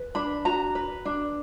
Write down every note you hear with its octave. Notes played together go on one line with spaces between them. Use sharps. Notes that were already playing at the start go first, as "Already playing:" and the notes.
Already playing: B4
D4 B5
F#4 A#5
B4
D4